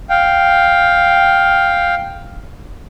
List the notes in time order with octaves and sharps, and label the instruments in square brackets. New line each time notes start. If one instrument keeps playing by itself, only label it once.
[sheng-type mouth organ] F5 G5